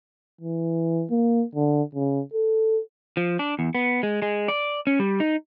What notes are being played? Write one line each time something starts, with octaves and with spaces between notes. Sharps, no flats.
E3
A#3
D3
C#3
A4
F3
D4
E2
B3
G#3
G#3
D5
C#4
G3
D#4